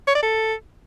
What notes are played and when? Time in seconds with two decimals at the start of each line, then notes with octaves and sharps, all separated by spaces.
0.08 C#5
0.15 D5
0.23 A4